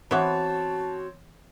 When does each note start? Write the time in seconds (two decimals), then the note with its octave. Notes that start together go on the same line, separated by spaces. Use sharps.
0.11 E3 B3 C4 F#4 C#5 A5